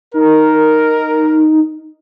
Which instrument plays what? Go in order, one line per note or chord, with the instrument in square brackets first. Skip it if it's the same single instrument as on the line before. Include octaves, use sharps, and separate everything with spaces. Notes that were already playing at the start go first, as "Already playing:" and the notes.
[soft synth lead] D#4 [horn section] A#4